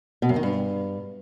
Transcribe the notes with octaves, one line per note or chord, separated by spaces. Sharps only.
B2
F#2
D#3
G2